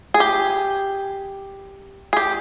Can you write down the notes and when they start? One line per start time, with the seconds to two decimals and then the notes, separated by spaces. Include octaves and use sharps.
0.14 G#4
0.20 G4
2.13 G#4
2.17 G4